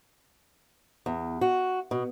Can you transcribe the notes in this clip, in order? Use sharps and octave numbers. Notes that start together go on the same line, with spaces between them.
E2
F#4
B2